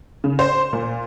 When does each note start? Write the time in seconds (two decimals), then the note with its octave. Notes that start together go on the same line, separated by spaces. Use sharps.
0.24 C#3
0.39 C5
0.73 A#2